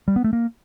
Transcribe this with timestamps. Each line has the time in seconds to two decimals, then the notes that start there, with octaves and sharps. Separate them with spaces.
0.08 G3
0.16 B3
0.24 A3
0.33 A#3